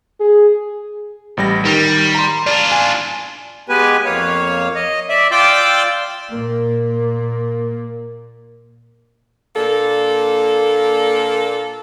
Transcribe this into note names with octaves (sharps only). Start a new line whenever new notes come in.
G#4
A1 G3 A#6
D#3 G3
A#5 C6
D4 F4 D5
G#5
G#3 B3 G4 B4 G#5
F2 A#3 C#5 F5
D#5
D5 E5
F4 D5 G5 C6 D6 E6
A#2 A#3
A#2 A#3 D4 A4